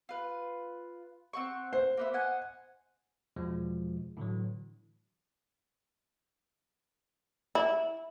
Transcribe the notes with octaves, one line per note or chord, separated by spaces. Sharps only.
F4 B4
C4 F#5 C#6
C5
A#3 B3 E5
D#5 F#5 G#5
E2 B2 F3 G#3
A2 D3 E3 F#3
E4